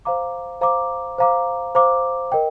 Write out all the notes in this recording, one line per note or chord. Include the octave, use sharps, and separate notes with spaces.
C5 F5 A#5 D6
C5 F5 A#5 D6
C5 F5 A#5 D6
C5 F5 A#5 D6
A#4 D#5 G5